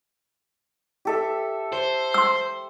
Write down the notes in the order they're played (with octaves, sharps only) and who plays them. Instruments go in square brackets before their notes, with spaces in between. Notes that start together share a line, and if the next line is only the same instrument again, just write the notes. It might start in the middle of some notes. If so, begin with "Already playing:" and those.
[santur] G4 A4 E5
[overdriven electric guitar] C5
[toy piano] C6 E6